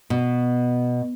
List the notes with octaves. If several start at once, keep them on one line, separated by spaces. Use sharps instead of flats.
B2